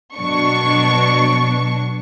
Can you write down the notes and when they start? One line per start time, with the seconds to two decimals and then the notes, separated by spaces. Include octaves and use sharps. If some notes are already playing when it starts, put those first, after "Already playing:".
0.16 B2 F#3 D4 C#6